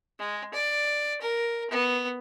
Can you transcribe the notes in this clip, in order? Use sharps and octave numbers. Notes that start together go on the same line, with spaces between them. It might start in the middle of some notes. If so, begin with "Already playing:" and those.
G#3
D5
A#4
B3